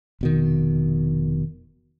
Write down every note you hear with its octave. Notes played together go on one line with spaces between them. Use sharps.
F1 B2 D#3